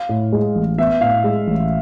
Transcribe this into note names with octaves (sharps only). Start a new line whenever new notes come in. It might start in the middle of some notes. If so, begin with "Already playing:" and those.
Already playing: F5
A2
G#3
A1
B3 E5
A2 F5
G#3
A1